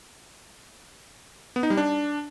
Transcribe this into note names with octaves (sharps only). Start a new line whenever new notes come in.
B3
D#4
G3
D4